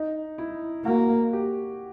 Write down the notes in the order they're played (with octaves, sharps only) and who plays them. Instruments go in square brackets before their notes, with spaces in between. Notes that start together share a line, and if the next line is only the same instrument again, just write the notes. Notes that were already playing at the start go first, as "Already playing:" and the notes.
Already playing: [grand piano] D#4
E4
[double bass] A#3 [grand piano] F#4
[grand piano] G4